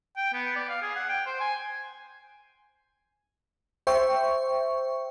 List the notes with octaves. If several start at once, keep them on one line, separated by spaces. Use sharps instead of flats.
G5
B3
D5
F5
G#4
F#5
G5
C5
G#5
C5 E5 G5 C#6